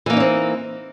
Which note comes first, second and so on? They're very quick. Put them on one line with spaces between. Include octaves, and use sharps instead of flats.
E3 A#3 D#4 C#4 C4